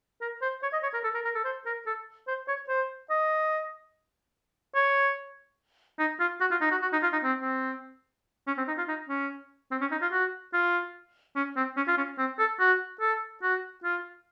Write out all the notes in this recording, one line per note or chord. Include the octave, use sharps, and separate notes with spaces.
A#4
C5
C#5
D#5
C#5
A#4
A4
A#4
A#4
A4
C5
A#4
A4
C5
C#5
C5
D#5
C#5
D#4
F4
F#4
F4
D#4
F#4
F#4
D#4
F4
D#4
C4
C4
C#4
C4
D#4
F4
D#4
C#4
C4
C#4
D#4
F4
F#4
F4
C#4
C4
C#4
F4
C#4
C4
A4
F#4
A4
F#4
F4